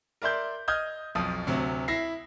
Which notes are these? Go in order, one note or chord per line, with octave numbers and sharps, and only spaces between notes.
A#4 D5 E5 C6 G6
D#5 D#6 F6 G6 G#6
B1 F2 F3 D#6
D2 C3 F#3
E4 A#6 C7